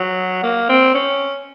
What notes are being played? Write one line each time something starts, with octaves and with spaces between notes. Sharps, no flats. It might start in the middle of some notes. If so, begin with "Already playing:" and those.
Already playing: F#3
A#3
C4
C#4